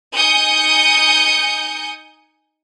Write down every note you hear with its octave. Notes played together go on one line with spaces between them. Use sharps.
D#4 G#5 D#6 G6 C#7